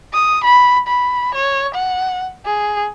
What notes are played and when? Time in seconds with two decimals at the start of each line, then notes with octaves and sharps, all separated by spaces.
0.13 D#6
0.44 B5
0.87 B5
1.34 C#5
1.74 F#5
2.46 G#4